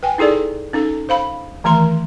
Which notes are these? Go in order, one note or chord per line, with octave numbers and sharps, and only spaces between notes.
B4 G5 G#5
D#4 E4 G#4 A4 D5
C#4 D#4 A4
C5 F5 B5
D#3 E3 A3 A#5 C6